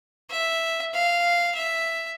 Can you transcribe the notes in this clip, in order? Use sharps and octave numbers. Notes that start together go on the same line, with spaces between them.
E5
F5
E5